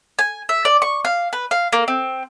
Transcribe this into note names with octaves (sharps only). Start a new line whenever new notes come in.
G#5
E5
D5
C#6
F5
B4
F5
A#3
C4